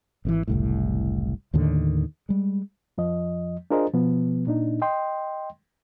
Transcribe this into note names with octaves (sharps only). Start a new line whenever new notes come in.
G#1 C3 E3
F#1 C2 A2
D#2 A2 D3 D#3
G3 G#3
F2 F3 D#5
D4 F4 G#4 A#4 C5 D#5
B2 F3 B3
A#2 D4 D#4
D#5 G5 C6